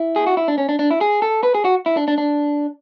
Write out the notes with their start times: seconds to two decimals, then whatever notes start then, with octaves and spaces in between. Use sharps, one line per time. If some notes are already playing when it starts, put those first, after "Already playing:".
Already playing: E4
0.16 G#4
0.27 F#4
0.37 E4
0.48 D4
0.58 C#4
0.69 D4
0.79 D4
0.91 E4
1.01 G#4
1.22 A4
1.43 B4
1.55 G#4
1.65 F#4
1.86 E4
1.97 D4
2.08 D4
2.18 D4